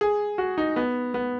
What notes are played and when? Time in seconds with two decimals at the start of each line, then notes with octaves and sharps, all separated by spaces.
0.01 G#4
0.38 F#4
0.58 D#4
0.76 B3
1.14 B3